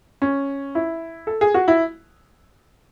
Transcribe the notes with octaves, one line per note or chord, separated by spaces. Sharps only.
C#4
E4
A4
G#4
F#4
E4